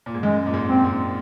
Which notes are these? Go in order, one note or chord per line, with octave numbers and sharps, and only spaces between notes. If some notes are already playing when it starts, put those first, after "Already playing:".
A#2
G#2
F#2 G#3
A#2
G#2
C4
G#2